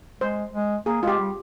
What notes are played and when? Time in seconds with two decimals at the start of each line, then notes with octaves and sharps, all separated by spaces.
0.21 G#3 C5
0.54 G#3
0.86 A#3 G#4
1.02 G#3 F4
1.07 G4
1.19 G3